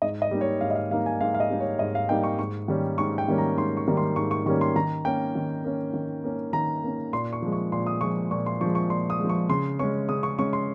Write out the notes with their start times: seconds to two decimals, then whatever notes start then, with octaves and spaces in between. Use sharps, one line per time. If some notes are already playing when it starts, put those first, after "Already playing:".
0.02 G#2 D#5
0.22 D#5
0.31 G3 A#3 D#4
0.41 C#5
0.61 G#2 F5
0.71 D#5
0.76 F5
0.91 G3 A#3 D#4 F5
1.06 G#5
1.20 G#2 F5
1.35 F5
1.40 D#5
1.50 G3 A#3 D#4
1.60 C#5
1.79 G#2 D#5
1.95 F5
2.09 G3 A#3 D#4 G5
2.24 C#6
2.39 G#2 C#6
2.68 D#3 G3 A#3 C#4
2.98 G#2 C#6
3.18 G5
3.28 D#3 G3 A#3 C#4
3.38 A#5
3.58 G#2 C6
3.77 C#6
3.87 D#3 G3 A#3 C#4
3.97 C6
4.16 G#2 C#6
4.31 C#6
4.46 D#3 G3 A#3 C#4 C#6
4.61 C6
4.76 D#3 A#5
5.05 A#3 C#4 G5
5.35 D#3
5.64 A#3 C#4
5.94 D#3
6.24 A#3 C#4
6.53 D#3 A#5
6.84 A#3 C#4
7.13 A#2 C6
7.33 C#6
7.42 F3 G#3
7.52 C#6
7.72 A#2 C6
7.87 D#6
8.01 F3 G#3 C#6
8.31 A#2 C#6
8.46 C6
8.61 F3 G#3 C#6
8.75 C#6
8.90 A#2 C6
9.10 D#6
9.19 G#3
9.24 F3
9.29 C#6
9.49 C#3 C6
9.79 G#3 C#4 C#6
10.09 C#3 D#6
10.23 C#6
10.39 G#3 C#4 C#6
10.53 C6